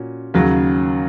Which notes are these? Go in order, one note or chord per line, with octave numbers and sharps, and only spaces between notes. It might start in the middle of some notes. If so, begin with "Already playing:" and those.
Already playing: A#2 C#4 F#4
D#2 C#3 F#3